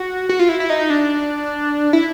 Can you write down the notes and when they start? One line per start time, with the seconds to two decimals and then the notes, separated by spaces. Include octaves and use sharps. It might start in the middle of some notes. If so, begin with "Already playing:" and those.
Already playing: F#4
0.29 F#4
0.39 F4
0.49 E4
0.60 E4
0.70 D#4
0.90 D4
1.93 E4